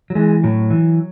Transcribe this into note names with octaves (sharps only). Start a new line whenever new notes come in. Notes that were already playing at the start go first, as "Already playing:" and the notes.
F#3
E3 G#3
A2 F#3
E3